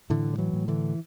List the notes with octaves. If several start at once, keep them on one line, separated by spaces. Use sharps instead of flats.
A2 D3 E3
G3
E3 F#3
A2
D3 E3